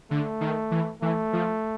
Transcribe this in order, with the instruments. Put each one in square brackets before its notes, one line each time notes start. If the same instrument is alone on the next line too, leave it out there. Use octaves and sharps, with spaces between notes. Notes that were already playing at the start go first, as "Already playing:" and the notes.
[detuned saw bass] D3 [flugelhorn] A3
[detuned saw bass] D#3
E3
[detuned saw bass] E3 [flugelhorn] A3
[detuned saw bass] F3